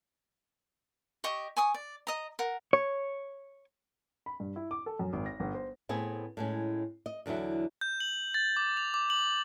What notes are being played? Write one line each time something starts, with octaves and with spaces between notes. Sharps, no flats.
G4 D#5 C#6
G#5 C#6 D#6
D5
D#5 A#5
A#4 F#5
C#5
B5
G2
E4
D6
A4
F#2
G#1
A#6
G1
C5
A2 B3 C4 G#4
A2 G#3 C#4
D#5
E2 D3 F3 F#3 E4
G6
F#7
A6
D6
F7
D6
F#7